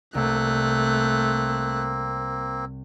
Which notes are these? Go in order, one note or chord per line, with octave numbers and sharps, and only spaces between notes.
C2 A3 A#3 C4 F#6